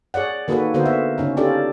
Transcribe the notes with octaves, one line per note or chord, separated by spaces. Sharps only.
G#4 C#5 D5 F#5
D#3 A#3 F#4 G#4 A4 B4
D3 B3 F#4 A#4 C5
E5
C#3 C#4 D#4
C#4 D4 F4 G4 A4 D5